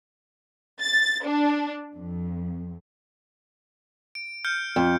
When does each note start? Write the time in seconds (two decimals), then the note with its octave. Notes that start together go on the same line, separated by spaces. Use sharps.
0.81 A6
1.24 D4
1.94 F2
4.15 D7
4.45 F6 G6 C#7
4.76 F2